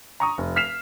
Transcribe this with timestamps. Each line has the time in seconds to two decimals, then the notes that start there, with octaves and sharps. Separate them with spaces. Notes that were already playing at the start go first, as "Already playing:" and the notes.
0.20 A#5 C#6 D#6
0.38 F1
0.56 F6 B6 C7 E7 F7